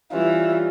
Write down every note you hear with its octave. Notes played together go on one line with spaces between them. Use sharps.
E3 G3 C#4 F4